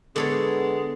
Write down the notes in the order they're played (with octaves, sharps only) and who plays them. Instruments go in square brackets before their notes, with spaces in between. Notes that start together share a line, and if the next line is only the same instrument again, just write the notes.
[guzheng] D3 A4 C#5 [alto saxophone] G#3 [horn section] B3